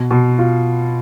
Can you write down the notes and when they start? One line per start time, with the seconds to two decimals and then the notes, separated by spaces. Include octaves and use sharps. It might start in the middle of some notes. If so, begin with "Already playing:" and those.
Already playing: B2
0.11 B2
0.39 F4